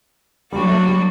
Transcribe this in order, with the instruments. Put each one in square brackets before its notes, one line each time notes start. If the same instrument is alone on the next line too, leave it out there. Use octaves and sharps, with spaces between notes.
[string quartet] F#3 A#3 D4 F#4 [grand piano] G3
[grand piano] A3
G3